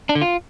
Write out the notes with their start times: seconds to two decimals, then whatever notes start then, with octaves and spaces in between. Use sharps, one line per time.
0.09 D4
0.15 D3
0.21 F4